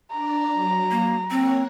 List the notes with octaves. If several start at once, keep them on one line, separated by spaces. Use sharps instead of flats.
D4 D5 A#5
F#3
A#3
A#3 C4 C#5 F#5